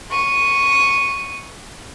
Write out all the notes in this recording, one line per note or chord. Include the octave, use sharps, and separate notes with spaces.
C#6 D#7